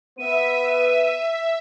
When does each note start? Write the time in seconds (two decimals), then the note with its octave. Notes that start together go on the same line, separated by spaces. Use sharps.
0.18 B3 B4 E5 D#7